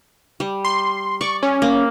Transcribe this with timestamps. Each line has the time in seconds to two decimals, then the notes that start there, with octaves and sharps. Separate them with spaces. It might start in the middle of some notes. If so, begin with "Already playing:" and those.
0.40 G3
0.65 C6
1.21 D5 C#6
1.43 C#4
1.62 A#3